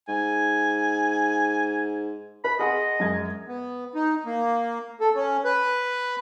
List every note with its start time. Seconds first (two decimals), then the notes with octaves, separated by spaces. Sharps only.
0.08 G#2 G#5
2.44 B4 B5
2.59 G#4 D#5 F#5 C6
3.00 F#2 G#3 G#6
3.48 B3
3.95 D#4
4.26 A#3
5.00 A4
5.15 C#4
5.45 B4